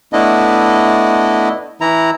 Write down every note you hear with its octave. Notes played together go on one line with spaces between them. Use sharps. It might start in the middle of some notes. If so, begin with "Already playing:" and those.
A3 B3 D4 E4 D#5
E3 E4 A#5